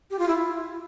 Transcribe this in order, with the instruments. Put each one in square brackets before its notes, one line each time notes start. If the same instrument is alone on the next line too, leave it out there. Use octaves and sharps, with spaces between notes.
[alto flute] G4
F4
E4